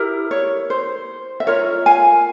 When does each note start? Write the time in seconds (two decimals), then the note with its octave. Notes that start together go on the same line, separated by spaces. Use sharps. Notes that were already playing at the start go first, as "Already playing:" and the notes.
Already playing: E4 G4 A#4
0.31 C#5
0.70 C5
1.40 E5
1.47 F4 A#4 C#5
1.86 F5 G#5